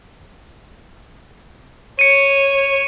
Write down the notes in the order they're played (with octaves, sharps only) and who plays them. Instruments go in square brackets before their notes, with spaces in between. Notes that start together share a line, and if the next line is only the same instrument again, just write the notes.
[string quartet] C#5 [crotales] C#7 D#7